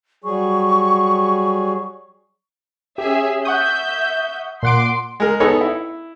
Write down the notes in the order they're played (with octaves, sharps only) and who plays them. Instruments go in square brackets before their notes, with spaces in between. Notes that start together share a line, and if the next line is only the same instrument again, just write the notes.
[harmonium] F#3 G3 G#4 [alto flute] C#6
[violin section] C#4 G#4 E5 [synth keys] G4
[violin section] E5 G6 [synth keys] F#5 C#6 D#6
[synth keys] A#2 F#5 D7 [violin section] C6 D6
[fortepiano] G#3 A#4
B3 D#4 G#4 A4 C#5
E4